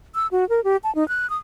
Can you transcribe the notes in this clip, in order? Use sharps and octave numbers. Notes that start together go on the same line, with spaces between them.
E6
F#4
A#4
G4
A5
D#4
F#6
D#6